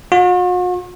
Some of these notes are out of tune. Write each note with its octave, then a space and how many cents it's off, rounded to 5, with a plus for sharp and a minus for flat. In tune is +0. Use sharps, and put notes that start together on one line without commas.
F#4 -45